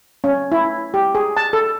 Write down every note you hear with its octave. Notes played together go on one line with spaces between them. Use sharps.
C#4
E4
G4
G#4
A5
A4